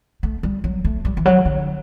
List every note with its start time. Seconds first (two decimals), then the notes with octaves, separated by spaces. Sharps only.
0.23 A3
0.43 G3
0.64 F#3
0.85 A3
1.05 G3
1.17 E3
1.25 F#3
1.45 D3